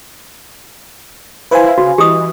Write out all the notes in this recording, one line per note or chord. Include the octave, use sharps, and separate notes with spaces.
E4 B4 C5 F5 G#5
C#3 F#4
E3 G4 D#5 D#6